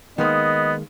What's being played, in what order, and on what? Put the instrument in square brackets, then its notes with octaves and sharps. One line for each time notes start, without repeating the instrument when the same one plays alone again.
[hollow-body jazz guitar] D#3 G#3 A#3 [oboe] B3 [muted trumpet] D#5